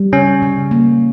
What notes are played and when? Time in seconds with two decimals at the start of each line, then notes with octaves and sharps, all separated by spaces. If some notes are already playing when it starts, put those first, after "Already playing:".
Already playing: G3
0.13 C#3 C#4
0.42 C#3
0.71 A#3